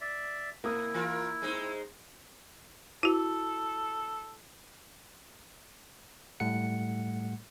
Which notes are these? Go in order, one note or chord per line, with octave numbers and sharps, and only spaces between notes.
D5 E5
B2 A#3 E4 D#6
E3 F4 A#4
G#3 C4 D#4
E4 F#4 A4
A2 G3 A3 F#5 C#7